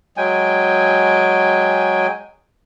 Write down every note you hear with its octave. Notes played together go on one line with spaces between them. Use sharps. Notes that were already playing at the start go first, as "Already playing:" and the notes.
F#3 G#3 G5 G#5